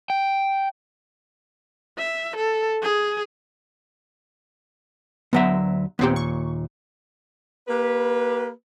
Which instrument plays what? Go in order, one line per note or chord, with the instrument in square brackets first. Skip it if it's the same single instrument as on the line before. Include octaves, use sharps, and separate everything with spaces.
[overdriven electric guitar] G5
[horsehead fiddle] E5
A4
G#4
[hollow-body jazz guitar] D2 F#3 E5 [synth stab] B3
[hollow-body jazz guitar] D#2 A#2 [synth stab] B3 C4 G4
[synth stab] C#6
[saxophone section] A#3 G4 B4